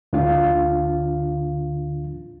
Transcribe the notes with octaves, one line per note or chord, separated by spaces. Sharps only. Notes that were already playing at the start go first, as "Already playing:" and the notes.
D2 D3 D4 F4 F5